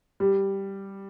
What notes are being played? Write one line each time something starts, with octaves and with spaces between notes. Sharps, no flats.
G3